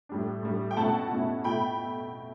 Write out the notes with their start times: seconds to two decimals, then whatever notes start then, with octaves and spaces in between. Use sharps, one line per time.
0.09 A2 G3 D4
0.43 A2 G3 D4
0.71 G5
0.77 B2 A3 C#4 E4 F#5 A5
1.11 B2 A3 C#4 E4
1.44 B2 A3 E4 G5 B5